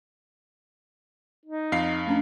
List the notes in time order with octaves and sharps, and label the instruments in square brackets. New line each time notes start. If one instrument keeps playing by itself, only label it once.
[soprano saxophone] D#4
[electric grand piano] F2 F5 C7
[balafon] A3 C#4 D4